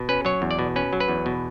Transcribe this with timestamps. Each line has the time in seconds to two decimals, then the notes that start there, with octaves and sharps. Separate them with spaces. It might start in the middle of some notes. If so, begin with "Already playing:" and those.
Already playing: B2
0.09 C#4 B4
0.25 F#3 C#5
0.42 E2
0.51 D5
0.59 B2
0.76 C#4 B4
0.93 F#3
1.00 B4
1.08 E2
1.26 B2